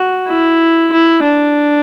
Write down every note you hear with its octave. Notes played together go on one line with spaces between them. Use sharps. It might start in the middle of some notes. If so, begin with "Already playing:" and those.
Already playing: F#4
E4
E4
D4